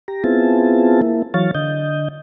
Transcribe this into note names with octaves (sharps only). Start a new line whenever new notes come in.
G4 A#5
B3 C4 E4 F4 G#4 A5
A#3 E4
E3 F#3 C#5 F5 A6
D3 D#5 G6